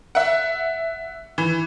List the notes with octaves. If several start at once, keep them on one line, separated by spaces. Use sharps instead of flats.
E5 F#5
E3